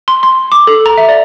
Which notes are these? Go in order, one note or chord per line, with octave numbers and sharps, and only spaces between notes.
C6
C6
D6
A4
A#5
E5
D5